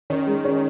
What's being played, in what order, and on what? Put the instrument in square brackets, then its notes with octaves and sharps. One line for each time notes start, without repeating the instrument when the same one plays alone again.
[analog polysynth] D#3 [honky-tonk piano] C#4
[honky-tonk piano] G#3
C#4